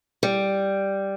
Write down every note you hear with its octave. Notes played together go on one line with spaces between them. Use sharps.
G3